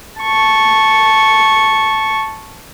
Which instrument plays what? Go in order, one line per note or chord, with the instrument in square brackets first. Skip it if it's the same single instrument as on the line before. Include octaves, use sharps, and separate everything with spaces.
[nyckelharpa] A5 C#6